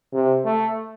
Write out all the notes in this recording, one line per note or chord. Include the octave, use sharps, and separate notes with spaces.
C3
A3